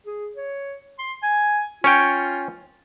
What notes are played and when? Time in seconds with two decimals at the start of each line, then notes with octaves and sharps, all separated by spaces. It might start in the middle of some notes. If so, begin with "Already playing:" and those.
0.06 G#4
0.36 C#5
0.99 C6
1.23 G#5
1.84 C#4 F4 C#5 G5